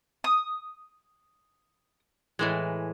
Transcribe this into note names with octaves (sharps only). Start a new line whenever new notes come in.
D#6
A2 E3 G#3